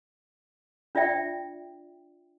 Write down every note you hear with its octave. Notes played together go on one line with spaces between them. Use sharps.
D4 F4 D5 E5 G5